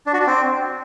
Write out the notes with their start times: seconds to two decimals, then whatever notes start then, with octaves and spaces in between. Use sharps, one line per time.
0.07 D4
0.13 F#4
0.20 D4
0.27 C4